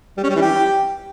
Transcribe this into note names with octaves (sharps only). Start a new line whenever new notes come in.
G3
C#4
G3
E3
G4